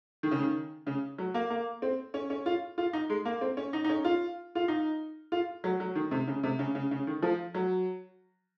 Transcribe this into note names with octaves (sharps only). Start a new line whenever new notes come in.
D#3
C#3
D#3
C#3
F#3
A#3
A#3
C4
C#4
C#4
F4
F4
D#4
G#3
A#3
C4
C#4
D#4
D#4
C#4
F4
F4
D#4
F4
F#3
F#3
D#3
C3
C#3
C3
C#3
C#3
C#3
D#3
F3
F#3